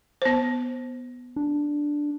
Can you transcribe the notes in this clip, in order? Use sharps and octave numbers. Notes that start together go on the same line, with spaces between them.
B3 C5
D4